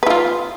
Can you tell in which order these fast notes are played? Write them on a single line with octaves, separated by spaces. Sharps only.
B4 E4 F4